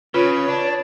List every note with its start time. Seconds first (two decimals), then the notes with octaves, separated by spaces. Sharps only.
0.14 C#3 F4 B4 C#5
0.49 D4